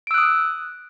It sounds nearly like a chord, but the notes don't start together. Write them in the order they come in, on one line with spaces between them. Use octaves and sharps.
D7 E6 F#6 D#6